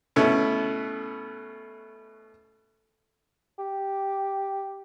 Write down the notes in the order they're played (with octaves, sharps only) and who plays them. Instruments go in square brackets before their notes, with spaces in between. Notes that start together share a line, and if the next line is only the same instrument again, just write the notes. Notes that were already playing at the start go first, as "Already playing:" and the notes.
[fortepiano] B2 A3 B3 C#4 E4
[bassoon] G4